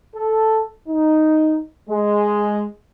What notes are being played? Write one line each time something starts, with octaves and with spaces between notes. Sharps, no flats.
A4
D#4
G#3